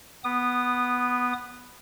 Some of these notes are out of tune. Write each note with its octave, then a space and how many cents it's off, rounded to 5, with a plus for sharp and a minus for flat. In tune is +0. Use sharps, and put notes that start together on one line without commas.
B3 +0 D#6 -25